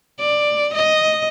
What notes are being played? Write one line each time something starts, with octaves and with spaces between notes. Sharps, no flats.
D5
D#5